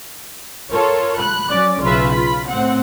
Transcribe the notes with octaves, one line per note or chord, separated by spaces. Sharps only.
F4 A4 A#4 C#5
B5 F#6
F#3 C#4 D5
B1 C#3 F4 B4 E5
F4 B5
A2 C4 F#5